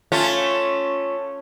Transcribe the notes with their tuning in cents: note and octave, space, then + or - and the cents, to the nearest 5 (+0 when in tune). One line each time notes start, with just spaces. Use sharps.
A3 +5 C#4 +0 F4 +0